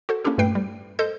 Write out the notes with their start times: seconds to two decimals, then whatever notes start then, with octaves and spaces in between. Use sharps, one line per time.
0.09 F#4 A4 C5
0.24 A#3 C#4 D4 E4 G4 A4
0.38 G2 A#2 A3 B4 G5 C7
0.55 G3
0.99 A4 C5 D#5 G6